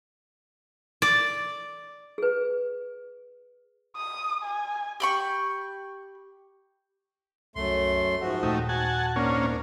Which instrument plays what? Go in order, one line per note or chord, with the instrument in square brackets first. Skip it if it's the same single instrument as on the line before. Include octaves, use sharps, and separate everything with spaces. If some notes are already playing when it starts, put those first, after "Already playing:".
[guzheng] D5
[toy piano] G#4 B4
[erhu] D#6
G#5
[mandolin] G4 B5 C#6
[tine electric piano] C2 [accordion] F#2 A3 C6
[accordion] G#2 F3 F#4 [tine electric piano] G#4 E5 F#5
[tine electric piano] D#2 A#2 G5 [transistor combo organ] A3 D#4
[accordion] F#4 [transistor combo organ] F#5 G#5 A5
[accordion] G#2 D4 [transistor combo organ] A#3 C#4